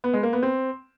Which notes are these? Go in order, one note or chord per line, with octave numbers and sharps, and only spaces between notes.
B3
G#3
A#3
B3
C4